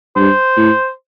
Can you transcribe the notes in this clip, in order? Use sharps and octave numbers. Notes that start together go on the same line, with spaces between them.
G2 C5
A2